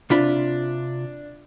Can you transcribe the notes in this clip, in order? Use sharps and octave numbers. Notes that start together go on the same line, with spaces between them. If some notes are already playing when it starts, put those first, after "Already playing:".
C3 D4 F4 B5